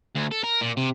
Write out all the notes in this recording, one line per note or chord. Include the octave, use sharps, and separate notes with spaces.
D2
A4
A#4
A#2
C3